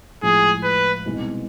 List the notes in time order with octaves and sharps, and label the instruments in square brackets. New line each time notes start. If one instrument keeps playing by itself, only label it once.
[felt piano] A2 F3 G#3 [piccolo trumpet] G#4
[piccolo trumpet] B4
[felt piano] C2 B2 G#3 C4 D#4